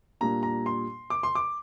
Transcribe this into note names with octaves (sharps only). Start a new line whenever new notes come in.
A#2 G3 A#3 D4 A#5
A#5
C6
D6
C6
D6